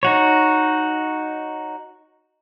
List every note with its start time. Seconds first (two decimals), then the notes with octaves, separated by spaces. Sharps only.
0.03 D#4 F#4 C#5